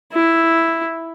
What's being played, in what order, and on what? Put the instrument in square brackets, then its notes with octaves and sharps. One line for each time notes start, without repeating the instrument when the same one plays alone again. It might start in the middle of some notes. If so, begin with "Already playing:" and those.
[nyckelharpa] E4